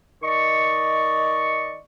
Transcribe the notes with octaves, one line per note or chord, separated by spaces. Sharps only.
D#3 D5 D#5 C#6